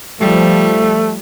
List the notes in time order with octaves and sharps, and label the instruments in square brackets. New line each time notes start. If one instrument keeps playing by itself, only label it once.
[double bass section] F3 [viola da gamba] G3 [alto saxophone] A3